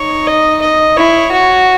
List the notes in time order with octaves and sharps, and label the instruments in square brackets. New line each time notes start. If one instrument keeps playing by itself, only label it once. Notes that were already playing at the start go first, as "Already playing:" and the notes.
Already playing: [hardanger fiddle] D#4 [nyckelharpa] C#5
[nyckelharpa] D#5
D#5
[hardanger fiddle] E4 [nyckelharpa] C#5
[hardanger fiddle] F#4